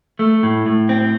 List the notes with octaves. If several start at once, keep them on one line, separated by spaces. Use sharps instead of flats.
A3
A2
A2
C4